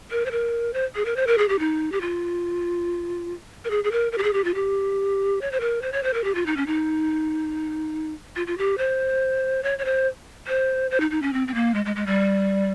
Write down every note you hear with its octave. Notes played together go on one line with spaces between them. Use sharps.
A#4
C5
A#4
C5
G#4
A#4
C5
A#4
G#4
G4
D#4
G4
F4
A#4
G#4
G#4
A#4
A#4
G4
G#4
G4
F4
G4
C#5
C5
A#4
C5
C#5
C5
A#4
G4
F4
D#4
C#4
D#4
F4
F4
G4
C5
C#5
C#5
C5
C5
C5
D#4
D#4
C#4
C4
C4
A#3
G#3
G#3
G#3
G3